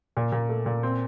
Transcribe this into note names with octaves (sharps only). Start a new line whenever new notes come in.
A#2
A#2
A3
A#2
C4